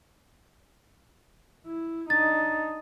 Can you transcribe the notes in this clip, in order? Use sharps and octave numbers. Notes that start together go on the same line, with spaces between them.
E4
D4 D#4 A6